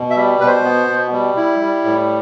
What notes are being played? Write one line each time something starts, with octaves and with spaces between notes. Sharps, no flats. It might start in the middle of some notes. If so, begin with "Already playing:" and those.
Already playing: B2
E5
G3
B2 B4
C5
B3
B2
G3
E4
G3
A2